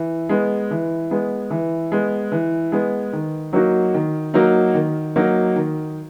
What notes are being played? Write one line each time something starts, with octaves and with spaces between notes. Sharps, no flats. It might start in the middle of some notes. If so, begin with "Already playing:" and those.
Already playing: E3
G#3 B3
E3
G#3 B3
E3
G#3 B3
E3
G#3 B3
D#3
F#3 A#3 D#4 F#4
D#3
F#3 A#3 D#4 F#4
D#3
F#3 A#3 D#4 F#4
D#3